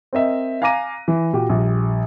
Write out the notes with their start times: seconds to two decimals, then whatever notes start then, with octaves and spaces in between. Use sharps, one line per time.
0.13 C4 A#4 D#5 E5
0.62 F5 G#5 A#5 D6 A#6 D#7
1.08 E3
1.33 A#2 F#4 G4
1.49 A#1 G3